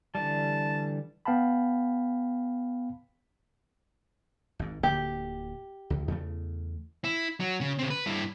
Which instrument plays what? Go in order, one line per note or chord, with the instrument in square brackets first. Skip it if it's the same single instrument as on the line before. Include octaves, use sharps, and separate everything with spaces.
[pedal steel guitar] D3 E3 G3 [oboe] A5
[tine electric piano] B3 F5 G5 A5 B5
[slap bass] G#1 G#2
[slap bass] D1 D3 A#3 [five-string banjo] G4
[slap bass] C#2
E2 C#3 A3
[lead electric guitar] E4
F#3
C#3
C#3 C4
B4
G2 E4